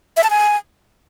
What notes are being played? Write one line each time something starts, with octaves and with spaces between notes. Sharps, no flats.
E5
A5
G#5